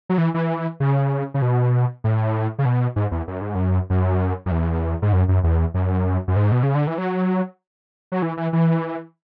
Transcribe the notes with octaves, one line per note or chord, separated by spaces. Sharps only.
F#3
E3
E3
C#3
C#3
B2
A2
C#3
B2
G#2
E2
F#2
G#2
F#2
F#2
F#2
E2
G#2
F#2
F#2
E2
F#2
F#2
G#2
B2
C#3
D3
E3
F#3
F#3
E3
E3
E3